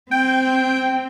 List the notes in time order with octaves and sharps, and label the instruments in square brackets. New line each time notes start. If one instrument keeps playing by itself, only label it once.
[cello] C4 [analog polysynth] G5